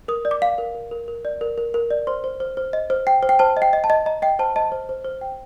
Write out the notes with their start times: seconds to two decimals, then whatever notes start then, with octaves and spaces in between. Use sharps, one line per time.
0.08 A#4 D#6
0.25 D5
0.31 D6
0.42 F5
0.58 A#4
0.75 A#4
0.91 A#4
1.08 A#4
1.25 D5
1.41 A#4
1.58 A#4
1.74 A#4
1.91 D5
2.07 C5 C6
2.24 C5
2.40 C5
2.57 C5
2.73 D#5
2.90 C5
3.07 G5
3.23 C5
3.29 G5
3.39 C5 A5
3.57 D#5
3.62 G5
3.73 D#5
3.84 A5
3.90 D#5
4.06 D#5 A#5
4.22 D#5 G5
4.39 C5 A5
4.56 D#5 A5
4.72 C5
4.89 C5
5.05 C5
5.21 G5